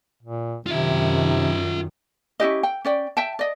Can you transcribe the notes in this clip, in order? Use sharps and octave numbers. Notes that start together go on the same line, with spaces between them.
A#2
F#2 C3 D#3 F4 E5
C#4 E4 G4 D#5
G5
C#4 D5 G5
E5 G5 A5
D5 D#5